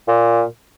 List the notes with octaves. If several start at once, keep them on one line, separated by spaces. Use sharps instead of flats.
A#2